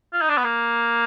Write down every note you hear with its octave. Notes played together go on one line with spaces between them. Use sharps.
F4
D#4
D4
B3
A#3